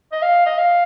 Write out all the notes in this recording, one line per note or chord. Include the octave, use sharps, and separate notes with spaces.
D#5
F5
D#5
F5